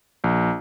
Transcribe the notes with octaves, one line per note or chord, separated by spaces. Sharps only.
A#1